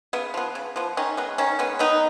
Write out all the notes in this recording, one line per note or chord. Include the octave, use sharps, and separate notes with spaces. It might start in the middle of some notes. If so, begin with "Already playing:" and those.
C#3 B3
F3 B3
C#3
F3 B3
D#3 C#4
G#3 B3
D#3 C#4
G#3 B3
D#3 B3 D#4